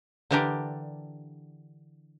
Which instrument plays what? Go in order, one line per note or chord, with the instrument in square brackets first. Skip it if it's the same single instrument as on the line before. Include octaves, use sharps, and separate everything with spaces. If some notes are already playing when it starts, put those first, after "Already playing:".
[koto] D3 E3 D4 G4 A#4 D5